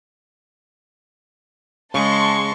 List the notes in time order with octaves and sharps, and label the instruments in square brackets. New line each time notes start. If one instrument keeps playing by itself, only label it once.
[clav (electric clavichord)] C#3 [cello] G#3 [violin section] A5 C6 [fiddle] C#6